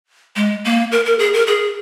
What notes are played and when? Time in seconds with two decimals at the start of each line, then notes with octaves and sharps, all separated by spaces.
0.36 G#3
0.65 A#3
0.92 A#4
1.06 A#4
1.19 G#4
1.34 A#4
1.47 G#4